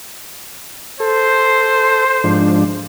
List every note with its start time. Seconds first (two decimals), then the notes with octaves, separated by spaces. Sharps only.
1.00 A4 C5
2.24 G#2 F3 D4